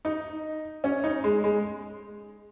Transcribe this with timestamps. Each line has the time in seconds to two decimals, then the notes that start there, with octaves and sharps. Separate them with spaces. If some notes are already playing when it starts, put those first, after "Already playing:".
0.05 D#4
0.84 C#4
1.04 D#4
1.24 G#3
1.44 G#3